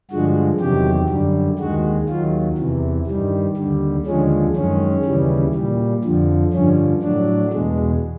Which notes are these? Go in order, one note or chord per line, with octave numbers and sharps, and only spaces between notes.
G2 D3 F3 G#3 F#4
E2 C3 D#3 F#3 G4
F#2 D3 G3
D#2 D#3 G#3 F#4
D#2 D#3 F#3 F4
E2 C3 E3
G2 D#3 G3
D#2 D3 G3
D#2 D3 F3 G#3 C#4
F#2 D#3 G#3 C#4
D#2 C#3 E3 G3
A#2 G3
F2 D3 F3
G2 D3 F3 C#4
A2 F#3 D4
E2 B2 G#3